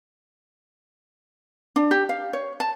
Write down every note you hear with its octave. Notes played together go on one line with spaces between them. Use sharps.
D4
G4
F5
C#5
A5